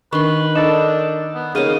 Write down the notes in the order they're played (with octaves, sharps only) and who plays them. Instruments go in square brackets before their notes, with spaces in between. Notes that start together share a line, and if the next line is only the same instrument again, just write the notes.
[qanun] D#3 C6 [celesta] D4 C#6 [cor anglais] B4
[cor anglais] D4 [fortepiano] D#4 A4 [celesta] A#4 A6 E7
[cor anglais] B3
[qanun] C#3 A#3 D#4 [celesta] G#4 D#7 [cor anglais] F5